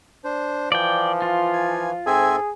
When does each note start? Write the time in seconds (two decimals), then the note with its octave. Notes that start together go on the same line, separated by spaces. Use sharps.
0.24 D4 C5
0.72 E3 F3 D5 G5
1.22 F4
1.53 G#5
2.06 G#2 C4 G#4 A4 E5 G#5